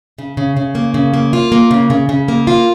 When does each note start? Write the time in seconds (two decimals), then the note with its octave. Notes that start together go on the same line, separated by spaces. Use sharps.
0.18 C#3
0.37 C#3
0.57 C#3
0.75 A#3
0.94 C#3
1.14 A#3
1.33 F4
1.52 A#3
1.71 C#3
1.90 C#3
2.09 C#3
2.28 A#3
2.47 F4